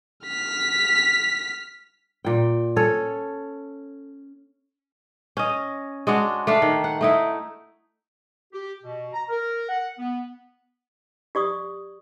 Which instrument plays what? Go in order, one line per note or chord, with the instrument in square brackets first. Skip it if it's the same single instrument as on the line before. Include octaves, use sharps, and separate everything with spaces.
[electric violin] F6 B6
[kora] A#2 G5
C#4 A4 C#5
C#4 D#5
G#3 D4 F#4 C#5
A3 D4 F5
D#3
F#5
A3 D#4 E4
[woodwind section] G4
B2
A#5
A#4
F#5
B3
[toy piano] G4 D5 C#6 D#6